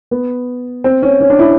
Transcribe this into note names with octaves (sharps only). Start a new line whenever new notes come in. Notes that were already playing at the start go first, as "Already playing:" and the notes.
B3
C4
C#4
C#4
D4
E4